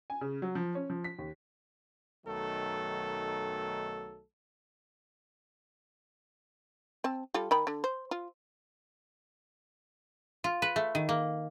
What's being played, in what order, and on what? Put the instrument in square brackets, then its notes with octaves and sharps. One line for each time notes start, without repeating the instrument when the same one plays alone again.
[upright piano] G#5
C#3
F#3
F3
C#4
F3
B6
D#2
[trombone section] B1 D#3 F#3 A3 A4
[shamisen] C4 A5
G3 F4 A4
D#3 G5 B5
D3
C5
F4
[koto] F4
B4
A3
D#3
A#3